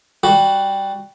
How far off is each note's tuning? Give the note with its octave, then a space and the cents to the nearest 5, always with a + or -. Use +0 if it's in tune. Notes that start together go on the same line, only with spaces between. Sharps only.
G3 +0 F#4 +10